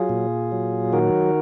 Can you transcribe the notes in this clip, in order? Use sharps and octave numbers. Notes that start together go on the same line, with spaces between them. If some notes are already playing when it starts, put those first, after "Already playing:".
Already playing: F#3 F4 G#4
A#2
F#3
D#3 F#4 A#4